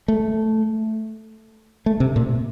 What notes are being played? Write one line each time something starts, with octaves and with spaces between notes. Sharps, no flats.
A3
A3
C3
A#2